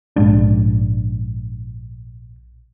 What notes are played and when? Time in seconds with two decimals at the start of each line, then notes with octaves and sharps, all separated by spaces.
0.16 A#1 G#2 G#3 D4